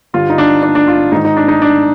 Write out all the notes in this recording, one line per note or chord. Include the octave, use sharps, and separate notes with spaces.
G2 D3 F4
D#4
D4
D4
D4
F4
G#2 D#3 D#4
D#4
D4
D#4
D4